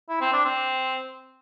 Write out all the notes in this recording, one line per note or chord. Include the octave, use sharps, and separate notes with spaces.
E4
C4
D4
C4